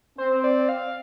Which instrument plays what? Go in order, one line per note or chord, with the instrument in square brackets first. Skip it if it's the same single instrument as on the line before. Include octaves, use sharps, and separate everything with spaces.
[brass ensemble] C4 [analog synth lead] C5
[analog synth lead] D5
F5